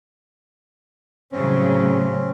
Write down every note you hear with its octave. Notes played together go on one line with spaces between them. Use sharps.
A2 C#3 F#3 C4 C#4